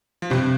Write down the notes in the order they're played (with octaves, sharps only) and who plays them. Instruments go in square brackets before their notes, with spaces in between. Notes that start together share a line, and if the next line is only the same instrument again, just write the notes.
[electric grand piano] F3
[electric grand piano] G2 G3 [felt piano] C3